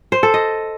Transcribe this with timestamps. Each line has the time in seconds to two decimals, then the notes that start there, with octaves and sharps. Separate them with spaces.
0.12 C5
0.23 A4
0.34 D#5